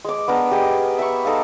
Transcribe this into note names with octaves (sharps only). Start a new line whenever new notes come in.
G#3 D6
B3 D4 A#4
G4 G#4 D#5
E5 B5 C#6
D#4 A4 D5 F5